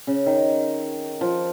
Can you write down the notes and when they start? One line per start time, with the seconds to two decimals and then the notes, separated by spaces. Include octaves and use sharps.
0.07 C#3
0.26 D#3
1.21 F3